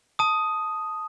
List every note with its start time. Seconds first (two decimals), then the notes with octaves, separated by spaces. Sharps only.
0.19 A5 D#6